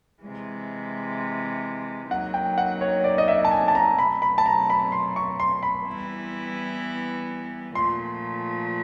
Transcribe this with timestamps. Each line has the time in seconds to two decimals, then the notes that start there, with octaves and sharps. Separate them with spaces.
0.22 C3 E3 G#3
2.10 F#3 A#3 D#4 F#5
2.34 G5
2.58 F#5
2.81 C#5
3.04 D5
3.18 D#5
3.28 E5
3.45 A5
3.51 G#5
3.68 A5
3.75 A#5
3.98 B2 F#3 A3 B5
4.22 B5
4.38 A5
4.46 A#5
4.70 B5
4.92 C6
5.16 C#6
5.40 C6
5.63 B5
5.87 E3 G3 B3 E4
7.75 A#2 F3 A3 C6